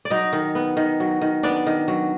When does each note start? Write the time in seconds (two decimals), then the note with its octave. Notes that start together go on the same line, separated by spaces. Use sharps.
0.05 D5
0.10 F#3 D#4 D#5
0.33 D#3
0.55 B3
0.77 D#3
1.00 F#3
1.22 D#3
1.43 B3 D4 D5
1.66 D#3
1.88 F#3